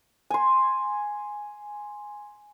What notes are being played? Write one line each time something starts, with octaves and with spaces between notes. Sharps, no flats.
G#5 C6